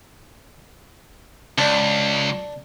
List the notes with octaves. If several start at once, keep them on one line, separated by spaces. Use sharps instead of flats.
C#2 D4